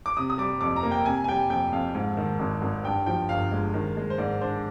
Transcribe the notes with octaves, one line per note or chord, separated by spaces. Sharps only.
D6
C3 D#6
D#6
G3 D6
F2 D6
A#5
A#3
G5
C3 G#5
G#5
G3 G5
F2 G5
F2 F5
G#2
D#3
G#1
G#1
G2 G5
F3 G5
G1 F5
G#3
D#3
G#3
C5
G#2 D5
D4 C5